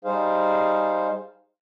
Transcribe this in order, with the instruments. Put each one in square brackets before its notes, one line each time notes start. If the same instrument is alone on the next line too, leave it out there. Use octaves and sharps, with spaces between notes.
[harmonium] G3 D#4 G#4 C5 F5